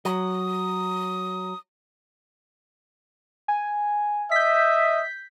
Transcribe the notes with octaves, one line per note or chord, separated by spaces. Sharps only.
F#3 D#6
G#5
D#5 E5 G6 B6